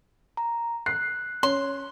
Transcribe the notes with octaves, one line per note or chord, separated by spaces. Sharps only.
A#5
F#6 C7
C#4 C6